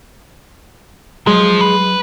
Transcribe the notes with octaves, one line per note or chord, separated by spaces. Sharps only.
F3 F#3 G#3
B4